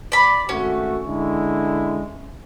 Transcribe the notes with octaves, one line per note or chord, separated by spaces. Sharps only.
D5 B5
G#1 A3 C#4 F#4
D3 G#3 E4